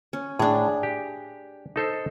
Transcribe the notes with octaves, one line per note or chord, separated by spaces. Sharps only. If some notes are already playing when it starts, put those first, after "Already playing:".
C#4
A2 D4 G#4
G4
D#4 A4 C5